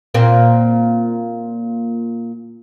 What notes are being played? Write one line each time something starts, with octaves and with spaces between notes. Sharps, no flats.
A#2 A#3 C4